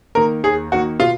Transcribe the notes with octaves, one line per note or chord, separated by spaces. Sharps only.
D#3 A#3 A#4
D#2 G#4
D#3 A#3 F#4
B2 F4